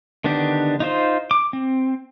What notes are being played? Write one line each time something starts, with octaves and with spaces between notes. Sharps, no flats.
D3 D#3 B3 D4 G4
D#4 F4 C5
D6
C4